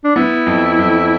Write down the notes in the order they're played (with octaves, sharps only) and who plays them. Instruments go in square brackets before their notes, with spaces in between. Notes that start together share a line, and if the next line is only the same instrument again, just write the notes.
[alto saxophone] D4
[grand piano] B3 [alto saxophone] E4
[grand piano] F2
F2